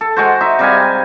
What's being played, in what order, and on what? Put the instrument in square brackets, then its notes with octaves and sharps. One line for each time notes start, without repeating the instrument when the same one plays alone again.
[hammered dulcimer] A4
G#3 F#4 C5
D#4 E5
C3 G3 F5 G#5